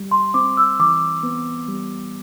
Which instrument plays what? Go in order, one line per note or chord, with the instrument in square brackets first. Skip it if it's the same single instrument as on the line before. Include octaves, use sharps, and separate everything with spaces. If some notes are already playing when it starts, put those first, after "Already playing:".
Already playing: [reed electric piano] G3
[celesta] C6
[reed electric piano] C4 [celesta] D6
[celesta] E6
[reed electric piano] E3 [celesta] D6
[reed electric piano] B3
G3